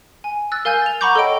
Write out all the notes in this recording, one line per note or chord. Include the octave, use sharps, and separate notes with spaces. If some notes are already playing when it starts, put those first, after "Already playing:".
G#5
E6 F#6 A6
A#4 F5 G#5 E6 G6
A6 F7
F#5 A#5 B5 C#6 D6 G6
A4 C#5 D#5 G5 D7